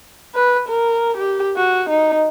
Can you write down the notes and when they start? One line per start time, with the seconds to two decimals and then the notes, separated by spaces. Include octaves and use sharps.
0.35 B4
0.68 A#4
1.17 G4
1.57 F#4
1.89 D#4